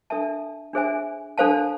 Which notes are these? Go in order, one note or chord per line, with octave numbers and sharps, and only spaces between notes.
D4 A4 E5 A5
D4 G#4 C5 E5 G#5
D4 A4 C5 F5 A5